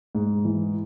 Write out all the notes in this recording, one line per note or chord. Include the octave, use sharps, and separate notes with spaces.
G#2
E3